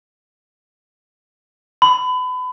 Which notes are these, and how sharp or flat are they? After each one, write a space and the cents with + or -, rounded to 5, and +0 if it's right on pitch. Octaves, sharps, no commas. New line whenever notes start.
B5 +30